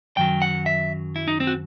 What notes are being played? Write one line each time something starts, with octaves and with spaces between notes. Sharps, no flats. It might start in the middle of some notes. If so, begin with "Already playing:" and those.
F#2 D#3 F#3 G5
F#5
E5
E4
D#4
C4
F#4